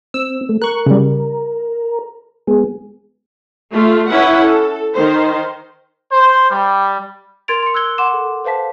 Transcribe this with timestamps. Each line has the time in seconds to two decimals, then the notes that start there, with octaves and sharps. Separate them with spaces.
0.14 C4 E6
0.49 A3
0.62 A#4 C#6 F#6
0.86 C#3 G3
2.47 G#3 B3 G#4
3.71 A3 F4
4.08 C#4 E4 B4 F#5
4.41 A4
4.93 D#3 C5
6.12 C5
6.50 G3
7.48 A#4 C6 G#6 A6 D7 F7
7.63 C6 C#7
7.74 E6 F#6 G#6 G7
7.98 F#5 C6 D6 E7
8.13 A4
8.44 B4 C5 F5 A5 B6